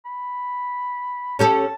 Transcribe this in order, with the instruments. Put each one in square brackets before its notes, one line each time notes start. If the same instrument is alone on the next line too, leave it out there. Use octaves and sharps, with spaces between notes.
[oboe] B5
[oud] C#4 G4 A4 [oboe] A5